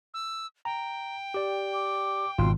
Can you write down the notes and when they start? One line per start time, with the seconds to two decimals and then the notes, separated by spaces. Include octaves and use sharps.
0.14 E6
0.65 G5 A#5
1.34 G4 D5
1.73 D6
2.38 G#1 B2 F4 C6